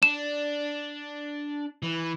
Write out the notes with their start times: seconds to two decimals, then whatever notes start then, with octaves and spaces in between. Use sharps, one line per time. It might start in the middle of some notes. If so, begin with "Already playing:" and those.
0.03 D4 E7
1.82 E3